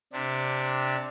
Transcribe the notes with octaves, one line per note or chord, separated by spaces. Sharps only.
C3 D4